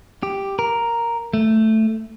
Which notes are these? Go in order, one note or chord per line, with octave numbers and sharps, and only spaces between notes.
G4
A#4
A3